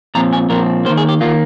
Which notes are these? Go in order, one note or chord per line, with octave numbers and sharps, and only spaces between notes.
A#2 F3 C4 A#5
G#5
A#2 F3 C4 A#4
D#3 A#3 C5
G#4
G4
D#3 A#3 F4